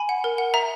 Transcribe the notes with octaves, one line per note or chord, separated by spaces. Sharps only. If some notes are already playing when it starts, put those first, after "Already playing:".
Already playing: G#5 B5
F#5
A#4
F#5
E5 A#5